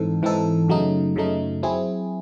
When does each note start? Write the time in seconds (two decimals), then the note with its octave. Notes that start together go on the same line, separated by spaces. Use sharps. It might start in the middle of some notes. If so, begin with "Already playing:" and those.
Already playing: G#2 E3 C4 D#4 A4
0.22 G#2 E3 C4 D#4 A4
0.68 F#2 C#3 F#3 A3 D#4
1.16 F#2 C#3 F#3 A3 D#4
1.63 F#3 C4 E4 G#4